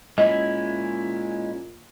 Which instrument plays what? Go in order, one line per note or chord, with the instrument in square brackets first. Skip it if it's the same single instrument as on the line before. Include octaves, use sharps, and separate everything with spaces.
[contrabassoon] A#2 [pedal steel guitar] G#3 C#4 E4 [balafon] D#5